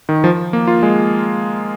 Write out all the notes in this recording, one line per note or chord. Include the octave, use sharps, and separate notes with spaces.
D#3
F3
A#3
F4
G#3